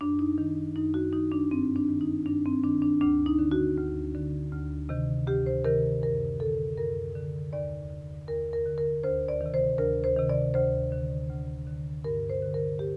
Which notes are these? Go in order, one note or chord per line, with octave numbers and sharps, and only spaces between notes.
F#2 D4
D#4
D#3
F#2 D#4
F#4
D#3 D#4
D4
G2 C4
D4
D#3
D#4
G2 D4
C4
D#3 D4
D4
D2 D4
D#4
D3
F#4
D2
D3
D2
C3 D#3
D2 G4
C5
C3 D#3 A#4
F#2 A#4
D3 A4
F#2 A#4
D3
D#2 D5
D3
D#2 A#4
A#4
D3
A#4
D2 C5
D5
C3 D#3
C5
D2 A#4
C5
C3 D#3
D5
D2 C5
D3
D2
D3
G2 A#4
C5
D3
A#4
G4